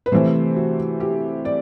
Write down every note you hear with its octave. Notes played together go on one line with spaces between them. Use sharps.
B4
C3 E3 A3 C5
F#4
G4
D5